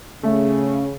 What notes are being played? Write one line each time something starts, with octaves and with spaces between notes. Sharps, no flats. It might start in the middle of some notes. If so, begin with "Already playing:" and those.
C#3 A3